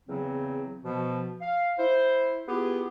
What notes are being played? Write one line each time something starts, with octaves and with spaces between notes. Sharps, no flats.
E2 C#3 F#3 C4
B2 F3
F5
E4 C5
B3 E4 F4 G4 G#4